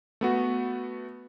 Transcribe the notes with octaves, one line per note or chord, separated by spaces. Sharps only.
A3 B3 F#4